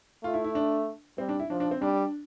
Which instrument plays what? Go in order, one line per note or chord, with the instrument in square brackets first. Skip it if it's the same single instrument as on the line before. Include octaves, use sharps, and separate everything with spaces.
[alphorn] A3 [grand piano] F4
[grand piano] E4
E4
D4
[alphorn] G3 [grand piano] C4
[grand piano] D4
E4
[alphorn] F3 [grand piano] D4
[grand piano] D4
C4
[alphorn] G3 [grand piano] D4